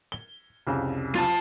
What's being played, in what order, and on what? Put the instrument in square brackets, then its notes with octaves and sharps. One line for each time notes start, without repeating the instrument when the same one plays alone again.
[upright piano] G7
C2 F2 C#3
[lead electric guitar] F4 A5